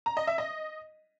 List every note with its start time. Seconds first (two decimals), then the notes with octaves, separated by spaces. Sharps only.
0.06 A#5
0.17 D#5
0.27 E5
0.38 D#5